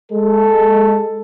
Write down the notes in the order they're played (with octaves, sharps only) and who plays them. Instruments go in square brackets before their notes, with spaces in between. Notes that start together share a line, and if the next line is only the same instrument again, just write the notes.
[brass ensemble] G#3 A4